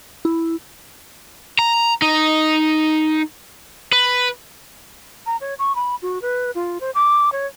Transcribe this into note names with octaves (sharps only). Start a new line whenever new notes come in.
E4
A#5
D#4
B4
A#5
C#5
C#6
B5
F#4
B4
F4
C5
D6
C#5